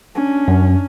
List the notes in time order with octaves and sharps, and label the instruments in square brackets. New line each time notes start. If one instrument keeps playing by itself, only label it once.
[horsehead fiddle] C#4 D4
[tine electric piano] F#2